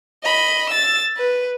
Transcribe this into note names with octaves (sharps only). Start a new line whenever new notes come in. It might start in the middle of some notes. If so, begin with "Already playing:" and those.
D#5 B5
E6 A6
B4